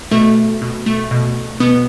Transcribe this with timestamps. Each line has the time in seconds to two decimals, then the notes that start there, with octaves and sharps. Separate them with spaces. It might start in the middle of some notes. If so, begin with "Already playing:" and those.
0.11 B2 A3
0.62 B2
0.86 A3
1.11 B2
1.60 B2 B3